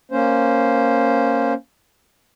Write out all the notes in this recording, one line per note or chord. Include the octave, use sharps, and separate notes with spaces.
A#3 C#4 C5